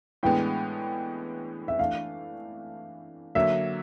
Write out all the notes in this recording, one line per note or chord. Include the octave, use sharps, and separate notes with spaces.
A2 E3 G#3 B3 D4 G5
E5
E3 A3 D4 F5
D3 F#3 A#3 E5